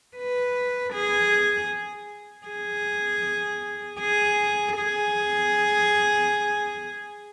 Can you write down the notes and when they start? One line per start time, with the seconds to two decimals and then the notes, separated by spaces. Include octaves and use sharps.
0.17 B4
0.94 G#4
2.47 G#4
4.00 G#4
4.77 G#4